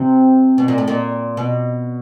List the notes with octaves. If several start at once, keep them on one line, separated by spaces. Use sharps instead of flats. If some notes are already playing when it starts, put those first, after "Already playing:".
Already playing: C3
B2
A#2
A2
A#2
B2